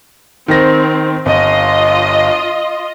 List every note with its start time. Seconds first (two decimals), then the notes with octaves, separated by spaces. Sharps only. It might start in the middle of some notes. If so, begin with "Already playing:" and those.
0.48 D#3 C4 A#6
1.26 G1 F4 D#5